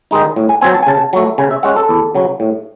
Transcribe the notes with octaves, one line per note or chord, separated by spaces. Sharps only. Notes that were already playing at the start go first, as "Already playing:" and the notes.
D#3 G#3 D#4
A2
G#5
F#3 C4 G#5
A5
G#5
C#3 A5
F#3 A3
C#3 G#5
E5
G#3 C#4 F#5
A4
E2
C#3 F#3
A2